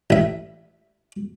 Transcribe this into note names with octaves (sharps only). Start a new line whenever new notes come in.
A1 E5